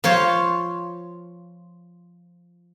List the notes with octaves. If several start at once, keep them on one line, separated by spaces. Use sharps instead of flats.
F3 F4 C5 C#5